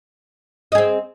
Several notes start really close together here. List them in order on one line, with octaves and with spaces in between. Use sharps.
D#5 G#4 C4